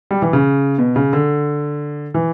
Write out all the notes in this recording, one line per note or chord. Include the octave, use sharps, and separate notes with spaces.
G3
E3
C#3
B2
C#3
D3
E3